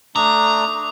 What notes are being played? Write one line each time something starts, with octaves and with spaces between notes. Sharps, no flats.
A3 D4 A#5 D6 D#6